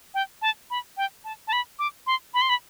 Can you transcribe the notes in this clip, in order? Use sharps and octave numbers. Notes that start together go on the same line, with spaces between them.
G5
A5
B5
G5
A5
A5
B5
D6
C6
B5
C6
B5